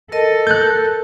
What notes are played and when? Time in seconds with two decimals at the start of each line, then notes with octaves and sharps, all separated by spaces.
0.12 A4 A#4 D#5 A5
0.47 A#4 A5 F#6 G6